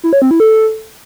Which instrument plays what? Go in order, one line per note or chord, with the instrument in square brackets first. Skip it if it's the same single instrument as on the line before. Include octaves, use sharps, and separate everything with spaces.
[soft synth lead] E4
C#5
C4
E4
A4